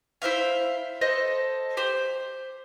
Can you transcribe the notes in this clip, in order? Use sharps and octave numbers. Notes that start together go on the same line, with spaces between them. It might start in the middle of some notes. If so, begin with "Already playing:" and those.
E4 C5 E5 F5
A4 C5 D#5
G4 C5